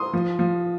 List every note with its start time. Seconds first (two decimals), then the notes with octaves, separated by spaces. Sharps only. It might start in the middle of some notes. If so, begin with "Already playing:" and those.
Already playing: C6 D#6
0.13 F3
0.39 F3